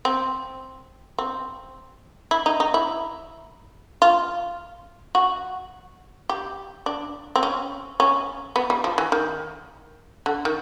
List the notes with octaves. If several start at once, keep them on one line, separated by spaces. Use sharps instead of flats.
C4
C4
E4
D#4
D#4
E4
F4
F#4
G4
D4
C4
C#4
C#4
B3
G3
F3
E3
D#3
D3
D#3